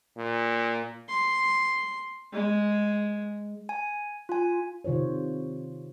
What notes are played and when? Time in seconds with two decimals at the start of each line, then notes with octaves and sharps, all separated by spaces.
0.17 A#2
1.09 C6
2.33 G#3
3.69 G#5
4.29 F4 G#5
4.84 C3 D#3 F4 C5 C#5